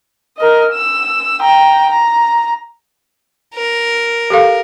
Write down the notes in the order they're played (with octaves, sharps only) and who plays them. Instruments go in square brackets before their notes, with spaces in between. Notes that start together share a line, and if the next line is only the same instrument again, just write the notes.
[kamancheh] A#4 D#5
E6
G5 A#5
A#5
[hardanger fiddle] A#4
[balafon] G4 A4 F5